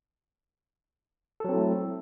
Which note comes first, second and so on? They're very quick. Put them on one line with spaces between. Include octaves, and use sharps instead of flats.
A4 F#3 C4 E4 A3